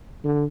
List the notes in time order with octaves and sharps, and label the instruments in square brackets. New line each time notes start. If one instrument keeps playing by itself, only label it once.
[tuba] D3